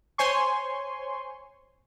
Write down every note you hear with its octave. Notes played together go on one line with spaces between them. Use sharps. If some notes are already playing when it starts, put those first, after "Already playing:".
C5 C#5 G#5 C6 C#6